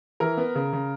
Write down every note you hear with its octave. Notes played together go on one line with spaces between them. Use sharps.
E3 A#4
B3
C#3
C#3